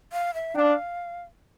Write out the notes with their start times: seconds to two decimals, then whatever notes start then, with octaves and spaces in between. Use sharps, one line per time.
0.13 F5
0.34 E5
0.55 D4 G5
0.59 F5